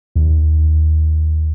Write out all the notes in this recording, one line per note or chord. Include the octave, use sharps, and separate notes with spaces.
D#2